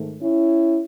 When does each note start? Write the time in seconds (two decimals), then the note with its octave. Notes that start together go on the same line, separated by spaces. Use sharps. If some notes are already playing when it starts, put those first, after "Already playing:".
Already playing: G#2 D#3 A3
0.21 C#4 E4